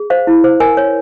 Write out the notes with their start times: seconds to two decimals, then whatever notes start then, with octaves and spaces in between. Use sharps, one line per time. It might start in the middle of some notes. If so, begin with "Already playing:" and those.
Already playing: G#4
0.10 C5 F5
0.27 E4
0.44 C5
0.60 A#4 G#5
0.77 C#5